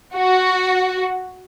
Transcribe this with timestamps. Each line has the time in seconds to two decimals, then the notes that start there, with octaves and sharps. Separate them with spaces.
0.14 F#4